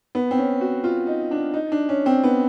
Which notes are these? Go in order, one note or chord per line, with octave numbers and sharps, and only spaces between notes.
B3
C4
C#4
F#4
F4
D#4
D4
D#4
D4
C#4
C4
B3